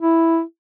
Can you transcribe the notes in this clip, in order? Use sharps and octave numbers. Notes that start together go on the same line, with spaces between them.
E4